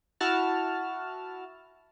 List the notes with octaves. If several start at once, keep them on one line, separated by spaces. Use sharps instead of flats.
E4 F#4 A5 F6